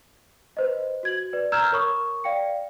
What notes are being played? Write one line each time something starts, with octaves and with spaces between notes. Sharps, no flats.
B4 C5 D#5
F#4 G#6 F#7
B4 D5
A#5 E6 F6 G6 G#6 E7
A#4 C#5 B5 C#6 D#6
D5 F5 G5 C#7